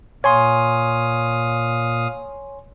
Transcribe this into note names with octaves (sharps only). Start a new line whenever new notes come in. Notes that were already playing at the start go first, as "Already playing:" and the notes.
A#2 C#5 F5 G#5 C6 D#6